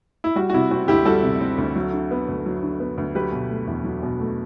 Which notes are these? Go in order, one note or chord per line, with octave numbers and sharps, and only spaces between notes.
E4
G3 F#4
F#4
C3 E4
C4 F#4
D2 E4 G4
G3 F#4 A4
C3
C4
D2
F#3
D3
B3
D2
F#3
D3
B3
D2
F#3 G4 B4
B2
A3
E2
F#3
B2
A3